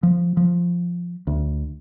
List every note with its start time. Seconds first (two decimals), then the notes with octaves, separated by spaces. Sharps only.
0.03 F3
0.37 F3
1.27 D2